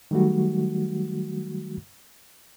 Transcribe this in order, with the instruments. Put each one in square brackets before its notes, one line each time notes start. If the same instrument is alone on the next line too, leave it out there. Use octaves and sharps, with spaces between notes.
[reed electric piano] D#3 F#3 G3 A3 F#4